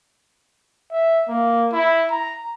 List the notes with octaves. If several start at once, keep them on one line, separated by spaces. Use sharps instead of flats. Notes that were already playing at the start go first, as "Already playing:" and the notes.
E5
A#3
E4
A#5